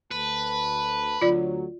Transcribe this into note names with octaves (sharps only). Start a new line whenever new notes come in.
D2 B4 A5
D2 F#3 F4 D5